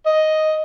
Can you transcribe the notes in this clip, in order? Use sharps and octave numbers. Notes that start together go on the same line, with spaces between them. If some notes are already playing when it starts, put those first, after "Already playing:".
D#5